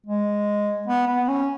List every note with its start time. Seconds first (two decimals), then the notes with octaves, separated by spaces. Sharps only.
0.06 G#3
0.87 B3
1.07 B3
1.28 C#4